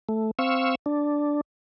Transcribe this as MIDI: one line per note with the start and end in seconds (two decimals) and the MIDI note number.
0.09 0.31 57
0.39 0.75 60
0.39 0.75 77
0.39 0.75 85
0.39 0.75 88
0.86 1.41 62